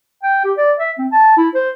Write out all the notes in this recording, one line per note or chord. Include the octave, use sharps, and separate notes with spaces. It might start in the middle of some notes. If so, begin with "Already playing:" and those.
G5
G4
D5
E5
C4
A5
E4
C5